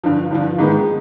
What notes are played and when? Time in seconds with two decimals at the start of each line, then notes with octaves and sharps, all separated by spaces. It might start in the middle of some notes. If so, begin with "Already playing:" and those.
0.04 G2 D3 F3
0.31 G2 D3 F3
0.59 G#2 D#3 G#3 B3